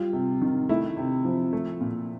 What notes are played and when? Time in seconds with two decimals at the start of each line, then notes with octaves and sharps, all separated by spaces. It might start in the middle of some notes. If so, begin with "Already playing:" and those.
Already playing: G3 F4
0.13 C3
0.41 D#3
0.69 A3 E4
0.97 C3
1.25 F3
1.53 A3
1.80 A#2